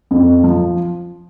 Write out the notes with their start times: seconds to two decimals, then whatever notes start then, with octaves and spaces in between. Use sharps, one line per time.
0.11 F2
0.44 F3